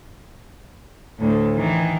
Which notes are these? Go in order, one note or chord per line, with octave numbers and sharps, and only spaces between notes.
D2 A2
D#3 E3